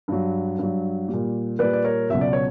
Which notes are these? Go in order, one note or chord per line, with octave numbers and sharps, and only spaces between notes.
G2 F#3
G2 F#3
G3
A#2
A#2 G3 B4 D5
D5
A#4 C#5
C#2 B2 F#3 E5
D5
C#5